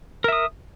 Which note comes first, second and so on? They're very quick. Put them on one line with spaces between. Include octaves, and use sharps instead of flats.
A#4 E5 D#6